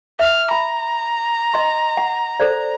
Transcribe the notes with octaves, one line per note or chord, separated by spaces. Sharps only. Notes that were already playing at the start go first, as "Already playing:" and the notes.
E5 F6
A#5 B5
D#5 C6
F#5
A4 C5 D5